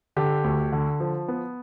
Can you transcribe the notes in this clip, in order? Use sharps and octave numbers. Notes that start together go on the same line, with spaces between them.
D3 G4
D2
D3
F3
B3